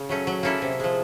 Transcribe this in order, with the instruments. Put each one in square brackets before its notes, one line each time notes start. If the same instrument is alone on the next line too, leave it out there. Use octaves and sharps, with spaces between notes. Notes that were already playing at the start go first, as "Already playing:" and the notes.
Already playing: [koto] C#3
F#3 A3 C#4
F#3
A#3 C#4 E4 A4
C3
F3 G#3